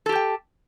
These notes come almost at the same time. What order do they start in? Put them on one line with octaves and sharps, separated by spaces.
A4 G4 A5 G5